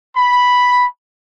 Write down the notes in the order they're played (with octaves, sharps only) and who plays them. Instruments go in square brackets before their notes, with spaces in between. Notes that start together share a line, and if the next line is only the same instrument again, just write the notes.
[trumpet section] B5